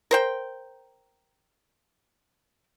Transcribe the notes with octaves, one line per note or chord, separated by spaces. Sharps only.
A#4 C5 G5